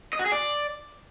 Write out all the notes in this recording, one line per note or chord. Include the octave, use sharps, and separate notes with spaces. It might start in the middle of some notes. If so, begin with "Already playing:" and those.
D#5
F#4
G#4
D5